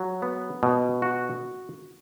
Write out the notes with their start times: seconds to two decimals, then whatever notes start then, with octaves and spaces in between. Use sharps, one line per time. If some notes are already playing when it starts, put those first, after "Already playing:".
Already playing: F#3
0.22 B3
0.63 B2
1.02 F#4